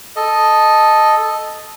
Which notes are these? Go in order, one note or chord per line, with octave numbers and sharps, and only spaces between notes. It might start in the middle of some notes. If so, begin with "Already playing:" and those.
A4 D#5